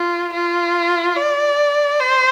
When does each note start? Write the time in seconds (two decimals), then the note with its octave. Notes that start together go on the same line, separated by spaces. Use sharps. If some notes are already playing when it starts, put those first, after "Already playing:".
Already playing: F4
0.34 F4
1.17 D5
2.00 C5